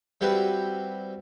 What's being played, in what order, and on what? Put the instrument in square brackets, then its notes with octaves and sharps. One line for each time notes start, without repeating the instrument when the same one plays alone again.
[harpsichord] G3 C4 E4 F#4 G4 B4